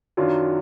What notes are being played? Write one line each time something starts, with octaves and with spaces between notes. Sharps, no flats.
F#2 D#3 F#3 D4 F4